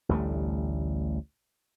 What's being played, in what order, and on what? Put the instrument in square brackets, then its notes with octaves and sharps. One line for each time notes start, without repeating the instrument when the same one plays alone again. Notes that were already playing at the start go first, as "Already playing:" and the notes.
[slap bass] A1 D2 G3 A3